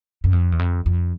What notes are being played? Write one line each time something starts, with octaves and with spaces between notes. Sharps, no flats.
F#2
F2
E2
F2
F2